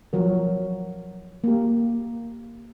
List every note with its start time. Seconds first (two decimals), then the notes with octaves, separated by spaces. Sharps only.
0.13 F3 F#3 A#4
1.44 A#3 G4